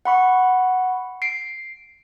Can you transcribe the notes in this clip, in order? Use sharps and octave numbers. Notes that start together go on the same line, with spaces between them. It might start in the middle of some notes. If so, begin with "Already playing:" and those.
F#5 B5 C#6
C7 D7